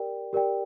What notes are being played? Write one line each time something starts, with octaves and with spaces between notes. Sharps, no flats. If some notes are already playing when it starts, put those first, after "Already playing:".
Already playing: G4 A#4 D5 G5
G4 A#4 D5 G5